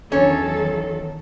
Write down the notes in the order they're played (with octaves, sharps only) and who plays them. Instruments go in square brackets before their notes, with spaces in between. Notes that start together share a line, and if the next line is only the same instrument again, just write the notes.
[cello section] E2 D#3 F#3 [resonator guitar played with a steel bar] C#4 [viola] A4 [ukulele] C#5